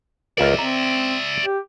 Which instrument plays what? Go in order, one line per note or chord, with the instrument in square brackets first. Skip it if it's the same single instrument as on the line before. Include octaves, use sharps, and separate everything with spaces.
[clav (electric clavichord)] C#2 F4 A#4 [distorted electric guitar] D5 E5
[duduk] C4 [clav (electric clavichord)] A#5
[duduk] G4